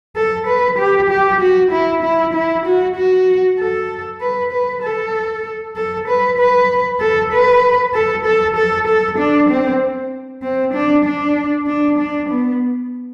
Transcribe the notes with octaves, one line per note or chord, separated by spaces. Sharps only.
A4
B4
G4
G4
F#4
E4
E4
E4
F#4
F#4
A4
B4
B4
A4
A4
B4
B4
A4
B4
A4
A4
A4
A4
D4
C4
C4
D4
D4
D4
D4
B3